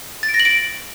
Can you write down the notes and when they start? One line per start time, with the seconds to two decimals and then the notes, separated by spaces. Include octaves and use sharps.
0.23 A6
0.29 D7
0.34 A#6
0.40 F#7
0.45 D7